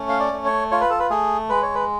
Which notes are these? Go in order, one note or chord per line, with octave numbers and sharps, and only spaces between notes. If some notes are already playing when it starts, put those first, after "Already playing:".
Already playing: A3 C#4
F5
D5
A3
C#5
F4 C#5
B4
A4
B4
A3 G#4
G#3 B4
C#5
B4